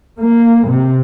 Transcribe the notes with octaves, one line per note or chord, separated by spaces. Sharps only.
A#3
C3